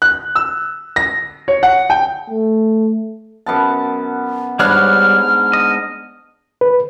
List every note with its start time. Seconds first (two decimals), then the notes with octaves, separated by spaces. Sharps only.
0.02 F#6
0.36 E6
0.96 A#6
1.48 C#5
1.63 F#5
1.90 G5
2.30 A3
3.46 F#2 B3 A5
4.59 G#2 G3 B3 D4 C#5 F6 F#6
5.53 D#5
6.61 B4